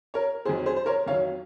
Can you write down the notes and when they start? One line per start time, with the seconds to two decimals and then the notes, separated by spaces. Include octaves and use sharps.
0.14 A#4 C#5
0.45 F2 D#3 F#3 G#4 C5
0.66 G#4 C5
0.76 C5
0.86 A#4 C#5
1.06 F2 D#3 F#3 C#5 F5